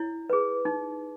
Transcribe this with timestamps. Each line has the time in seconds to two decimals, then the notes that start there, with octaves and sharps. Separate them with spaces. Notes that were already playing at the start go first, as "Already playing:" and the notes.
Already playing: E4 C#5
0.30 G#4 B4
0.65 D#4